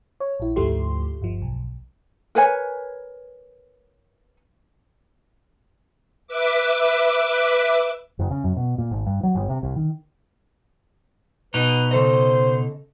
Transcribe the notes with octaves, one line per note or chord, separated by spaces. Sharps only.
C#5
A#1 E4
D2 G#2 F3 A3 G4 C6
G1 F3
B1
A#4 B4 C#5 G#5
B4 E5 D6
F#1
C#3
F#2
B2
A#2
G#1
G2
F#3
G1
C3
C2
D#3
B2 D#4 B4
C#3 A4 C5 D#5